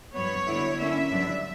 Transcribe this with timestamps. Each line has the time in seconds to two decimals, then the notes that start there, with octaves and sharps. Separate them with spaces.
0.14 G2 F#3 B3 C#5
0.46 D3 F#3 B3 E4
0.78 D3 A#3 C#4 E4 E5
1.10 G2 D3 F#3 B3 D4